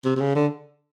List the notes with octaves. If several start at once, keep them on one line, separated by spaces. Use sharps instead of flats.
C3
C3
C#3
D3